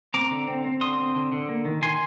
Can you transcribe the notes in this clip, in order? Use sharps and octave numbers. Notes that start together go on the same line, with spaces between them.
C4 A#5 D6
D3
C4
C4
D3 C6 D#6
C4
D3
D3
A#3
D#3
D#3 G#5 C6